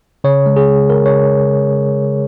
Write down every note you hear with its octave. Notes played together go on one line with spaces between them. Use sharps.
C#3 C#5
G#3
G#4
G#3
C#3 A#4
C#5
C#3